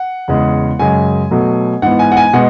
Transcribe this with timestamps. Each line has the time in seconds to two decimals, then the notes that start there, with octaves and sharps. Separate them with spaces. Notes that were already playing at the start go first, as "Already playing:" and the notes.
Already playing: F#5
0.28 E2 C#3 G#3
0.79 F#2 C#3 G#3 G#5
1.31 B2 F#3 A3
1.82 G#2 E3 B3 F#5
1.99 G#5
2.12 F#5
2.17 G#5
2.33 B2 G#3 B3 F#5